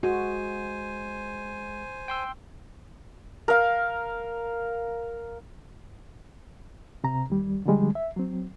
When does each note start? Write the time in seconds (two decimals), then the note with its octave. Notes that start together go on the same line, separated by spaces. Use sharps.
0.03 G#3 F#4 C5 G#5
2.08 G5 C6 E6
3.48 A#4 F5
7.04 C3 C4 A#5
7.30 D#2 G3
7.65 D3 F3 G3 G#3
7.95 E5
8.16 F#3 C4